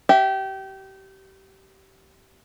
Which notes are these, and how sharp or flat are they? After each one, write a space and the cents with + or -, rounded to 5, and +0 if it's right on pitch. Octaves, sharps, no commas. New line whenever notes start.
G4 -25 E5 +0